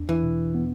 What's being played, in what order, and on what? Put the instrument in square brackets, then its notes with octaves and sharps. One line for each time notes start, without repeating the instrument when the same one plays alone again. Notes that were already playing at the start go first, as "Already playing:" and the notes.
Already playing: [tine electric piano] E2 D4
[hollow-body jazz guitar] E3
[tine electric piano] B2
B3